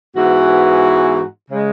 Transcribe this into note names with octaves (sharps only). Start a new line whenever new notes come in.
G#2 E3 B3 F#4
C#3 G#3